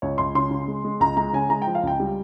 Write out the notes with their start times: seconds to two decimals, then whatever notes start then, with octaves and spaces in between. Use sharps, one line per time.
0.02 C#2 C#5
0.18 C#2 C6
0.35 C#3 C6
0.51 C#3
0.68 G#3
0.84 G#3
1.00 C#2 A#5
1.17 G#3 A#5
1.33 C#3 G#5
1.49 G#3 A#5
1.62 G5
1.67 F3
1.75 F5
1.83 C#2 G5
2.00 G3